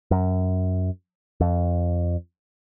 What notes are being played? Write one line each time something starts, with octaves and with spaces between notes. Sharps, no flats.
F#2
F2